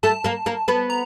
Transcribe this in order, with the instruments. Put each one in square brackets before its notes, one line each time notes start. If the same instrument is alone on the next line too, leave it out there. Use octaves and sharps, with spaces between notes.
[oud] A3 A4 [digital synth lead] A5
[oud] A#3 A#4
A#3 A#4
B3 B4
[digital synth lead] A#5